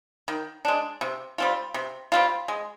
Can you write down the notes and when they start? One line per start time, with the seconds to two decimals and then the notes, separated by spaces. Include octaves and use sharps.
0.28 D#3
0.65 G#3 D4
1.01 C3
1.38 G3 C4 F4
1.74 C3
2.12 G3 C4 F4
2.48 G#3